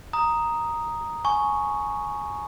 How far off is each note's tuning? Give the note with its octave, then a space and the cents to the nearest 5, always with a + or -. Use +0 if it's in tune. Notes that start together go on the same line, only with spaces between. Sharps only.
A#5 +0 D#6 +0
G#5 +15 C#6 +0